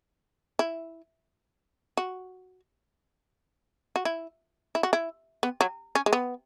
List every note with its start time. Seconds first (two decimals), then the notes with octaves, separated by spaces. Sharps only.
0.59 E4
1.97 F#4
3.96 F#4
4.05 E4
4.75 E4
4.83 F#4
4.93 E4
5.43 B3
5.61 F#3
5.95 C#4
6.06 G#3
6.13 B3